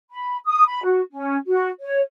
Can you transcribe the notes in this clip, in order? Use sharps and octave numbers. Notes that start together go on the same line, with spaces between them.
B5
D#6
B5
F#4
C#4
F#4
C#5